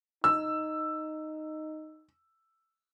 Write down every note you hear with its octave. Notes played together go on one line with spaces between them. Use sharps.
D#4 E6